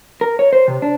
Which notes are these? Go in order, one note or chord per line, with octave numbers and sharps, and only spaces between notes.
A#4
C#5
C5
C3
D4